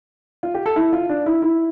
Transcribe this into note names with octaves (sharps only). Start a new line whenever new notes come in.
F4
G4
A4
E4
F4
D4
E4
E4